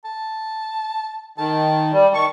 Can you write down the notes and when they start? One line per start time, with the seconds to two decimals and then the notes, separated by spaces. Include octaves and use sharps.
0.05 A5
1.38 D#3 A5
1.92 G3
2.14 D#3 A5 C#6